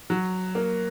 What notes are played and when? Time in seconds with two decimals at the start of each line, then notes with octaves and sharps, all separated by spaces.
0.10 F#3
0.55 A#3